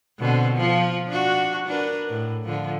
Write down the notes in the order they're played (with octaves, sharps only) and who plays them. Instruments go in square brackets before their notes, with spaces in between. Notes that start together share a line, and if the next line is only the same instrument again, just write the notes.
[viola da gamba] B2 D3 C4
F3
D4 F#4
D4 A#4 B4
A2
D3 F3